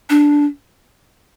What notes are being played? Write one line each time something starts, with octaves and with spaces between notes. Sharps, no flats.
D4